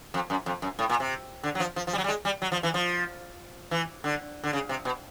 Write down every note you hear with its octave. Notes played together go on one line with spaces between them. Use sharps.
F2
F#2
F2
F#2
A2
A#2
C3
D3
F#3
F3
F3
F3
G3
F#3
G3
G#3
G3
F#3
F3
E3
F3
E3
D3
D3
C#3
C3
B2